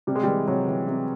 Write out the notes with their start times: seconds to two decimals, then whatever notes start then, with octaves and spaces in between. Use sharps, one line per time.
0.07 C3 G3
0.15 G#3
0.23 E3 G3
0.48 C3 F#3
0.68 E3
0.87 C3